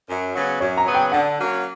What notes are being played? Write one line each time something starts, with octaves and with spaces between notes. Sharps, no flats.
F#2
C#3 F#3 B3
F#2 C#5
A#5
C#3 F#3 B3
G5
D3 F#5
F#3 A#3 C#4